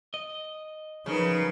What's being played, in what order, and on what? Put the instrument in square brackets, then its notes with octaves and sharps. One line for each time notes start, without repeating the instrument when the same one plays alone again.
[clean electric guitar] D#5
[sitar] C#3 [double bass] F3 F#3 [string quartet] D#4 A#4 B4